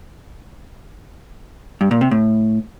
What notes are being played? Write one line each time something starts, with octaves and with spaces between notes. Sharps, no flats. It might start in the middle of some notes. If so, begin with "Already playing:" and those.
G2
A#2
C3
A2